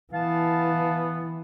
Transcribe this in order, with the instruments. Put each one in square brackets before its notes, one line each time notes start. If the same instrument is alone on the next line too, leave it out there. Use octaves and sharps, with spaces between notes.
[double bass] E3 [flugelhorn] B3 [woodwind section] F5 A5